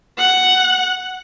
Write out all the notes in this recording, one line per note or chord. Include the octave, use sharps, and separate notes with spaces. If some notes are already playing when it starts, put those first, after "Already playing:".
F#5